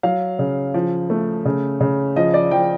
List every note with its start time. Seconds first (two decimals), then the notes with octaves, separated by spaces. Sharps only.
0.03 F#3 F5
0.39 C#3
0.74 F3
1.10 A3
1.45 C#3
1.81 C#3
2.16 F3 D#5
2.34 D5
2.51 F3 G5